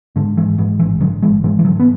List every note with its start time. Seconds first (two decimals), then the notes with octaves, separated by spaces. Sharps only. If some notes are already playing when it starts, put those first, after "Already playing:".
0.16 G#2 D3
0.37 G#2 E3
0.58 G#2 E3
0.79 A1 E3
1.01 G#2 D3 F#3
1.22 G#1 E3 G#3
1.44 G#2 E3 G#3
1.59 E3
1.65 G#2 D3 F#3
1.80 B3